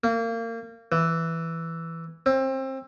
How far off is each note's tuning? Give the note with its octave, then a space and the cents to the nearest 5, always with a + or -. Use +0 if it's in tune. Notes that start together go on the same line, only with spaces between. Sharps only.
A#3 -30
E3 +0
C4 +25